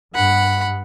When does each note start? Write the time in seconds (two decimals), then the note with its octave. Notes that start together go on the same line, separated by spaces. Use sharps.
0.15 G2 F#5 B5